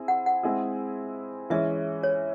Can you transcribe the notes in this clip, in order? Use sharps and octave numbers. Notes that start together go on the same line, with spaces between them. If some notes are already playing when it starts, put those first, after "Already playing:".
Already playing: C4 E4 G#4
F#5
F#5
G#3 C4 E4 G#4
E3 G#3 C#4 E5
C#5